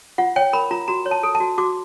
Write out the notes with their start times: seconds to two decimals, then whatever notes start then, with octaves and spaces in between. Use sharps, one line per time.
0.18 F4 F#5
0.36 C#5 G5
0.53 A#4 B5
0.71 F4 A#5
0.88 F#4 A#5
1.06 C#5
1.11 A5
1.23 A4
1.35 A5
1.40 F#4
1.58 F#4 D6